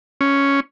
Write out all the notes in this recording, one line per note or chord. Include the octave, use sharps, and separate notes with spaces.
C#4